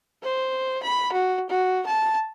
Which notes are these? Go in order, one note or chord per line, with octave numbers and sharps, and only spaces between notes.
C5
B5
F#4
F#4
A5